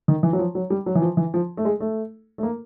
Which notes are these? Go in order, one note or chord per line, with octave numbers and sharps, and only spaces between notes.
D#3
E3
F#3
F3
F#3
G3
F#3
E3
F3
E3
F3
A3
G#3
A3
A3
A#3